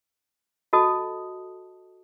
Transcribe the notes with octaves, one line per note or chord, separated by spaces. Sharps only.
F#4 A4 D#5 A5 D#6